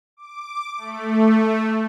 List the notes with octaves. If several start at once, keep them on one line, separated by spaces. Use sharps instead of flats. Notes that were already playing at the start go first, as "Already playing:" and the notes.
D6
A3